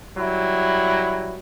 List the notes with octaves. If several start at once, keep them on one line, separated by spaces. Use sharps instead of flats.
F#3 G3 E4